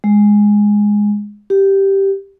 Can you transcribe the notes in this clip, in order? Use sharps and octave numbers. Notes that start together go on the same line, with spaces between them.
G#3
G4